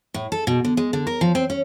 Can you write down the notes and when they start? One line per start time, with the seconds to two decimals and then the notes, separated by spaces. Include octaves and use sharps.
0.14 A2
0.32 A4
0.47 B2
0.65 D3
0.77 G#3
0.93 D3
1.07 A#4
1.21 F3
1.35 C4
1.50 C#4